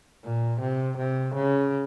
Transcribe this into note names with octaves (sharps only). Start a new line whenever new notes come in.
A#2
C3
C3
C#3